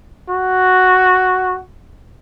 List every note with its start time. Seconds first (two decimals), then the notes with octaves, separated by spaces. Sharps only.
0.29 F#4